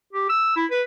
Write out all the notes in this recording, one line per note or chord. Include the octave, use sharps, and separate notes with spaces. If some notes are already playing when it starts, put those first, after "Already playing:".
G4
E6
E4
B4